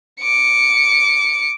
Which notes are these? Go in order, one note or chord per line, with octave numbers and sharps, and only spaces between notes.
D6 C#7